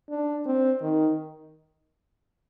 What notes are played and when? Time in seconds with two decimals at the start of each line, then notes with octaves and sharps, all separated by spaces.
0.10 D4
0.46 C4
0.82 D#3